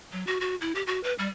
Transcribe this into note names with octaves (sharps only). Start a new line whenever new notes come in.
F#3
F#4
F#4
E4
G4
F#4
B4
G3